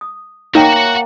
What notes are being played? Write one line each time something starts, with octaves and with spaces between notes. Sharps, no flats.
D#6
A#3 D#4 F#4 C#5 E5 G5
F#4 F#5